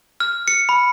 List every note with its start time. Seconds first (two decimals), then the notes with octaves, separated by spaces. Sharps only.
0.20 F6
0.48 C#7
0.69 B5